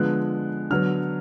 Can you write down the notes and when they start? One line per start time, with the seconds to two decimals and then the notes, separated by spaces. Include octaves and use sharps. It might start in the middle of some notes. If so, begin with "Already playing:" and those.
Already playing: D3 F3 G#3 B3 F#6
0.70 D3 F#3 B3 F6